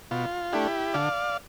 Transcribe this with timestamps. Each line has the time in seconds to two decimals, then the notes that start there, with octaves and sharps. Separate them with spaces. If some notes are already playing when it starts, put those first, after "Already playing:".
0.11 B2 F4
0.53 A3 D4 E4 G4
0.94 D3 D5 F5